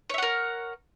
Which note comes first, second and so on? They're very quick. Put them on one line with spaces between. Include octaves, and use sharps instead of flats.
C#5 E5 F#5 A#4